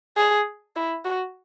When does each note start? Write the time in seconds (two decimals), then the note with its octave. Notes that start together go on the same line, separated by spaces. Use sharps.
0.17 G#4
0.76 E4
1.05 F#4